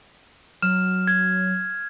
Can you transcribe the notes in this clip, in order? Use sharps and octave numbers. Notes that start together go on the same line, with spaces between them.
F#3 F6 E7
G#6